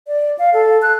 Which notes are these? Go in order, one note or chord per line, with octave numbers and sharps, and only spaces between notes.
D5
F5
A4
F#6